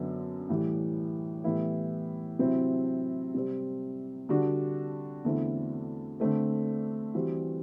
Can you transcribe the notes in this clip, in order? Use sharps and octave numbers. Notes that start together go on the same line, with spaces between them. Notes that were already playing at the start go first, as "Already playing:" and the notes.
Already playing: F#2 D3 F#3 B3
A2 E3 G3
A2 E3 G3 B3 E4
C3 F#3 C4 E4
C3 G3 C4
D3 G3 D4 F#4
E2 D3 A3 C4 E4
D3 A3 C4
E3 G3 C4 F#4